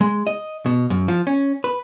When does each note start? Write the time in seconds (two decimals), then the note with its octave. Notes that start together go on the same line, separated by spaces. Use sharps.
0.01 G#3
0.27 D#5
0.66 B2
0.90 F#2
1.08 F3
1.27 C#4
1.64 B4